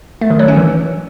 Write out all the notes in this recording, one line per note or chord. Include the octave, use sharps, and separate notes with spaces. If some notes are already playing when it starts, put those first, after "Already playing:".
A3
D#3
F#3
C#4
E3